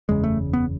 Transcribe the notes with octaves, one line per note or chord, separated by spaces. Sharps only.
F#1 E2 C#3 G#3
A3
B3